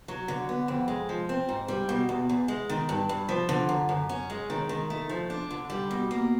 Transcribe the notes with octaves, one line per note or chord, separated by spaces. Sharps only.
F#3
D3
B3
F2
G#3
F3
C4
G#2
G3
B2
E2
E2
G#3
D#3
G2
G2
F3
D3
F#2
F#2
C#4
G#3
D#3
D#3
A3
F3
D4
D3
G3
B2
A#3